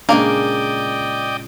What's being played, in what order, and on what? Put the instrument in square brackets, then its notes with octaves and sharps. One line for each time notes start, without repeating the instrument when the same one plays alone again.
[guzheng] A#2 C#3 G#3 [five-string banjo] A#3 [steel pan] D4 [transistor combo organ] D5 D#5 G5